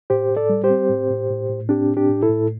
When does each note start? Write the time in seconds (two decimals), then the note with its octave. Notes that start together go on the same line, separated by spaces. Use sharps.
0.10 A2 G4 C5
0.30 A2
0.37 A4 D5
0.49 G3
0.64 G4 C5
0.70 C4
0.89 A2
1.10 A2
1.30 A2
1.49 A2
1.69 C4 D4 G4
1.90 A2
1.97 D4 G4
2.09 A2
2.22 E4 A4
2.29 A2